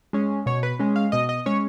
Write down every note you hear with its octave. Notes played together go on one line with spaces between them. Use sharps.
G#3 C#4
B2 C#5
B4
G#3 C#4
F5
B2 D#5
D#5
G#3 C#4 C#5